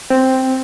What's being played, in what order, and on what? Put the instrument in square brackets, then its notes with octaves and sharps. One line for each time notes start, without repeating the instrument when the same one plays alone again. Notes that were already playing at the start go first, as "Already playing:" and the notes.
[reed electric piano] C4